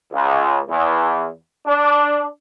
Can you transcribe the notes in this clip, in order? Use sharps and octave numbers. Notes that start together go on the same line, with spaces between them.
C#2
E2
D4